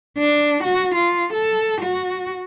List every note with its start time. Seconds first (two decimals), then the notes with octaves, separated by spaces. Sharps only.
0.18 D4
0.63 F#4
0.94 F4
1.33 A4
1.81 F#4